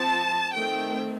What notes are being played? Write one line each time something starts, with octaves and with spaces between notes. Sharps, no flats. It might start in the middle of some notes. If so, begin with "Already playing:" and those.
Already playing: F3 C4 A5
D#3 A3 C4 G5